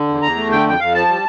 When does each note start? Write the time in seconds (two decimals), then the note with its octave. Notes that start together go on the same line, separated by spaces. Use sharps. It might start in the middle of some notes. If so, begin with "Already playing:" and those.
Already playing: D3
0.08 E2
0.22 E2 A#5
0.36 A3
0.51 D3 G5
0.66 F2 G5
0.80 F2 F5
0.94 F3 A5
1.09 G3